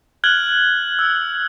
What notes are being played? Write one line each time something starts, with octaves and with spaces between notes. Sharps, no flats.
F6 F#6 G#6 F#7 G7
E6